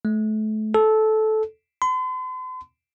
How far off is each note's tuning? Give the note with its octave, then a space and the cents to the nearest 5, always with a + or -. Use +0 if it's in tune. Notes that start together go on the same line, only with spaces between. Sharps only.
A3 -30
A4 -15
C6 -45